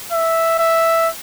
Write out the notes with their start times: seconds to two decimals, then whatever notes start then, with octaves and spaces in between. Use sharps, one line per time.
0.12 E5
0.59 E5